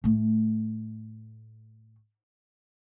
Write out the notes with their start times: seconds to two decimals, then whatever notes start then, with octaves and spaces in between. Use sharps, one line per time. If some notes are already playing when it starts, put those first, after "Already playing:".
0.04 A2 A3